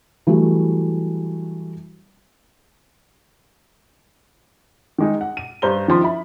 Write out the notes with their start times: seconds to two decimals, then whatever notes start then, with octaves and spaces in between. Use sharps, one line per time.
0.27 E3 F#3 G3 A3
4.98 D#3 G#3 D#4
5.21 F#5
5.37 D#7
5.62 G2 C5 A#5 G7
5.88 D#3 F3 C6
6.02 E4 B5